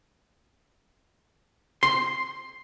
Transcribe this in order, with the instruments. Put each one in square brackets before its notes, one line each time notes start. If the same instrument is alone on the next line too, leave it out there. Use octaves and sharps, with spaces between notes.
[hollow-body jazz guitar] C6